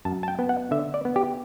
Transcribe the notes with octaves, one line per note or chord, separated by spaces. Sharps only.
F#2 A5
A5
G5
B3
F#5
D3 E5
D5
B3
G4